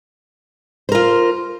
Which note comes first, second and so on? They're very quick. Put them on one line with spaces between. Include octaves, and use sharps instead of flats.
C5 A#4 F4